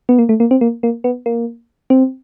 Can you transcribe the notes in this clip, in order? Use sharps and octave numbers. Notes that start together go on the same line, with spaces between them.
B3
A#3
A3
A#3
C4
A#3
A#3
B3
A#3
C4